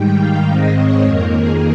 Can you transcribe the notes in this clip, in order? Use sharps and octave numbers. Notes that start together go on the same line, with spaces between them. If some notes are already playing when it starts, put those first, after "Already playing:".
Already playing: G#2 D#3 G3 G5
F5
G#2 D#3 G#3 C4 D#5
C#5
F2 D#3 A#3 A#4
G#4